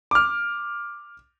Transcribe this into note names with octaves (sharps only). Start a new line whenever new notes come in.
D6 F6